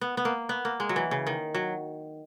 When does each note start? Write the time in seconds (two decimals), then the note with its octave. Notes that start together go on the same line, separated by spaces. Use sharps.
0.01 B3
0.17 B3
0.25 A#3
0.49 B3
0.65 A#3
0.80 G#3
0.89 F#3
0.96 E3
1.11 C#3
1.27 D#3
1.54 F#3